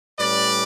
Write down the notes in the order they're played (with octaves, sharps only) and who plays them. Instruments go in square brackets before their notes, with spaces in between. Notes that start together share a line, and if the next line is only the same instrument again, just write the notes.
[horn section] A2 G3 C#4 B4 D5